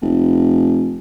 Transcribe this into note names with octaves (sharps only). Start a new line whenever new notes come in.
F1